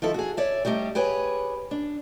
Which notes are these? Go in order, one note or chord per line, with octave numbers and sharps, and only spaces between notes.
D#3 F3 E4 A4
F#4 G#4
C#5 D5 E5
G3 A3 D#4 G4
G4 G#4 B4 C#5 G#5
D4